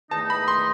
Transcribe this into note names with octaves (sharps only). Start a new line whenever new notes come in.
E2 D#3 A3 D#4 A5
B5
C6